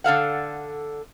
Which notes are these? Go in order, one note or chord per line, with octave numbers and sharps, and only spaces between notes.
D3 A4 F5 F#5